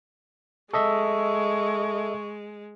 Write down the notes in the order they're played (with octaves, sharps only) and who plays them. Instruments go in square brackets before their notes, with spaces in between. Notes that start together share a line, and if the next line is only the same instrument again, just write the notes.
[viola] G#3 [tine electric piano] A4 D#5 E5 [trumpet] C#6